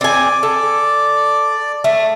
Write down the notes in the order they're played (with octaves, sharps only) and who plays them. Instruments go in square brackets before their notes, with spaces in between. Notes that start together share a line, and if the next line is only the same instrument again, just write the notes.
[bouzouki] C4 G#5 [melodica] D5
[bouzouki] A4
A3